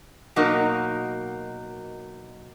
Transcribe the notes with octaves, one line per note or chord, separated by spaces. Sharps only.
B2 F#3 A#3 D#4 A#4